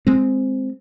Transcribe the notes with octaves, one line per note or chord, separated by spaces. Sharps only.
G#3 C4